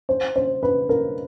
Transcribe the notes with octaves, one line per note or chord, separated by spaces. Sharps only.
C5
C5
B4
A#4